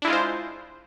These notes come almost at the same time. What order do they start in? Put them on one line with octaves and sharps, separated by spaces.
D4 E4 G#3 F4 C5